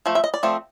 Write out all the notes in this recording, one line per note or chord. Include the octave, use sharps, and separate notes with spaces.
F3 A3
E5
D#5
D5
F3 A3 C4